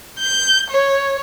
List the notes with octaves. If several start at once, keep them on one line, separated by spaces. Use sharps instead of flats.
G6
C#5